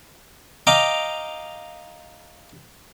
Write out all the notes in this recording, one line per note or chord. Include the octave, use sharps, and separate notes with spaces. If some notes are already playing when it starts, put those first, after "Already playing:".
D#5 F5 G5 A#5 D6